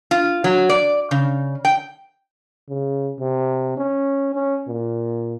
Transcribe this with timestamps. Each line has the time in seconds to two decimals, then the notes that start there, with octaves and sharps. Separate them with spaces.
0.11 F4
0.44 F#3
0.69 D5
1.11 C#3
1.65 G5
2.69 C#3
3.20 C3
3.77 C#4
4.35 C#4
4.68 A#2